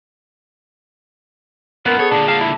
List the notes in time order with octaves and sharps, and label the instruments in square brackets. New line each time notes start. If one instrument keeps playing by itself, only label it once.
[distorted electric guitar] F#2 A#2 [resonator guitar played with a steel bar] B3 [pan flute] A#4
[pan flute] G#4 [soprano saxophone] A4 [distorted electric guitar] C#5
[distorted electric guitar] A#2 D3 [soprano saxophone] D4
[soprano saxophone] F5 [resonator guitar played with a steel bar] A5
[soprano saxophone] E4